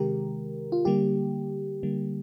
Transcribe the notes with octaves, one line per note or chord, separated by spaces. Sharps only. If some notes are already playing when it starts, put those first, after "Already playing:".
Already playing: C3 D#3 G#3 G4 A#4
F4
D3 G3 A#3 G4
D3 G3 A#3